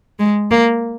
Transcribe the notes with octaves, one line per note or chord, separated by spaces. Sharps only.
G#3
A#3